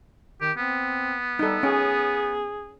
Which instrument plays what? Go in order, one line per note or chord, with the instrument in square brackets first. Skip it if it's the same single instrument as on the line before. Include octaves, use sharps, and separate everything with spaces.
[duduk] D#3 [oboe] G4
[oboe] B3 [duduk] C4
[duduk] G3 [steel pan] D#4 A4
[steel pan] C#4 [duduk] G#4